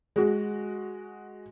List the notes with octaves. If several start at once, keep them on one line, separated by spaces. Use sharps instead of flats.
G#3 F#4